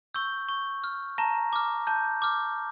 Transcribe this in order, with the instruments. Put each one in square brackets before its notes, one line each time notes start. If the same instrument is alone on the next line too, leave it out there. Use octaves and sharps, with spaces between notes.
[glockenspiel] C#6 E6 G6
C#6
F6
A5 A#5 A#6
D6 F6
A5 G6
D6 F6